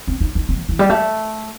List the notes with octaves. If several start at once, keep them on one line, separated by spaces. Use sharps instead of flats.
C4
D#4
D#4
C4
E3
E3
G3
A3